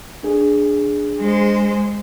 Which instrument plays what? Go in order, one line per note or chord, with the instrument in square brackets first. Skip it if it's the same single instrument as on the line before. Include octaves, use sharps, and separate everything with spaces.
[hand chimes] D4 G#4
[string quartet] G#3 C5